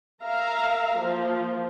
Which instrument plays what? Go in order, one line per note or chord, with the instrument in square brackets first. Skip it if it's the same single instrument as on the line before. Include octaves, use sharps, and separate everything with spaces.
[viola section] A#4 E5 F5 A#5
F3 A#3